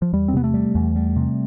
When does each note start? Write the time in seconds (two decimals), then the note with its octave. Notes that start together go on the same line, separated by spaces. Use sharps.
0.02 F3
0.13 E2 G3
0.28 C4
0.34 C3 B3
0.44 A3
0.54 G3
0.74 E2
0.95 G3
1.16 C3